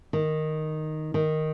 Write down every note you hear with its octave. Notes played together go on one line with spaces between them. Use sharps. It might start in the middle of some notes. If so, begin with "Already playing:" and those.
D#3
D#3